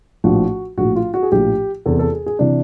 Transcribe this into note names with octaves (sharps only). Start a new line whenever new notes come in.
A#1 A2 F3 F#4
A#1 A2 F3 F#4
F4
F#4
G#4
A#1 A2 F3 G4
E2 C3 E3 A4
A4
G#4
G#4
C3 E3 D4